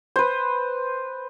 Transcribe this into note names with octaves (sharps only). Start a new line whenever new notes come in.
B4 C5